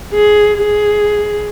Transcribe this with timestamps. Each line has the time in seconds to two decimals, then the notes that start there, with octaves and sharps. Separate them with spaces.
0.13 G#4
0.57 G#4